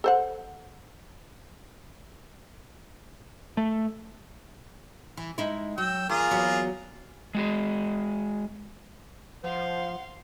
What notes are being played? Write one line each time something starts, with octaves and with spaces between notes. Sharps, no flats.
A4 C5 F#5
A3
E3
G#3 D#4 E4
F#3 G5 E6
E2 A#3 F4 G#4
E2 F#3 B3
G#3 F#4 G#4
F3 C5 F5 F#5 C6